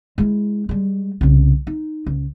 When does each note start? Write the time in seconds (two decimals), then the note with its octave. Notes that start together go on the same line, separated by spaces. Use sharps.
0.18 G#3 E4
0.69 G3 G#3
1.21 C2 C#3
1.67 D#4
2.06 C#2